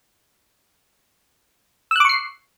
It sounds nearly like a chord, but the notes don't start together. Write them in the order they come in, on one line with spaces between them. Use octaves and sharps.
E6 F#6 D6 C#6 C7